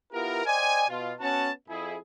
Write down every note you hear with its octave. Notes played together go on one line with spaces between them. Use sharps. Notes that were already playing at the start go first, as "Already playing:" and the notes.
B3 E4 F4 G4 A#4
C5 D5 D#5 G5 G#5
B2 F4
B3 C#4 F#4 A5
F2 E4 G#4